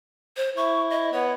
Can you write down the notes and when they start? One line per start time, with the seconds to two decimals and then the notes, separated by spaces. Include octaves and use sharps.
0.37 C5
0.57 E4 C#6
0.90 D#5
1.13 B3 C#5